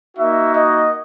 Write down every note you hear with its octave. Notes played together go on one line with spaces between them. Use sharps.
A#3 D#4 F#4 E5
D#5